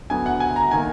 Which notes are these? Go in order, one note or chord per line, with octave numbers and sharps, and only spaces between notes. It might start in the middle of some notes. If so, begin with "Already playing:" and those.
D2 D3 F#3 B3 G#5
F#5
G#5
A#5
D#3 A#3 G#5